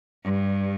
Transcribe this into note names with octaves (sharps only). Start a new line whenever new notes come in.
G2